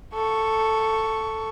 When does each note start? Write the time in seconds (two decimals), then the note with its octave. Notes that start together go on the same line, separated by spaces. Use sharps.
0.14 A4 C#6